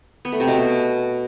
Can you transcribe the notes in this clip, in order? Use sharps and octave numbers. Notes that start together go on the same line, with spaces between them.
B3
A3
C3
B2